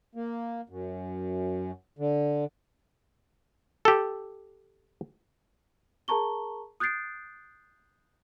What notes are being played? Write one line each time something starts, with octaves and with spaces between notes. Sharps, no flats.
A#3
F#2
D3
G4 A4
G#4 A#4 A5 A#5 C#6 G7
D#6 F#6 G6 A6 C7 D7